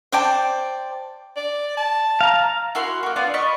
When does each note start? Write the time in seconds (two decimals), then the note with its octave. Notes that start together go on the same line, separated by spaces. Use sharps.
0.12 C5 D5 G5 A5
1.36 D5
1.77 A5
2.21 F5 A#5
2.75 E4 F#4 A#4 C6
3.03 A#3 F#4
3.16 B3 D4 F4 D5
3.34 D5 D#5 B5 C#6